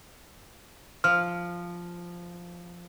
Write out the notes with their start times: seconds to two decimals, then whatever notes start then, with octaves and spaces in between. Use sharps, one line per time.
1.04 F3 F6